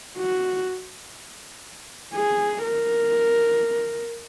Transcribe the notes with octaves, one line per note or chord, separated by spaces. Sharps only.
F#4
G#4
A#4